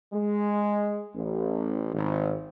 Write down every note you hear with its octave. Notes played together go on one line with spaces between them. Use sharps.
G#3
A1
G#1